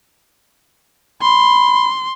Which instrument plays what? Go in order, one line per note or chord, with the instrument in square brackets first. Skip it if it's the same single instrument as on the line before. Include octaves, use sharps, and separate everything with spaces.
[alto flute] B5 [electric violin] C6